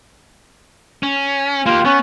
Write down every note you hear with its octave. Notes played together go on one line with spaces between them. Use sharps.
C#4
A#3 F4 G4
B3 C#4